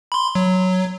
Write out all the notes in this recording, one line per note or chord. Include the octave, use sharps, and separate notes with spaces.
B5 C6
F#3